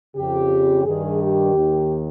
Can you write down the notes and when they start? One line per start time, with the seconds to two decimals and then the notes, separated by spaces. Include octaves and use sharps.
0.15 F2 C#3 G4
0.85 G2 D#3 G#4
1.21 G4
1.55 D#2 D#3